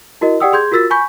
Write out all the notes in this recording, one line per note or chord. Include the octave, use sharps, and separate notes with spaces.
E4 F#4 A#4 D#5
G4 D5 F#5 G5 D#6 E6
G#4 C6 G6 G#6
F4 F#4 A#4 E6 A6 B6
G#5 B5 C#6 G6 B6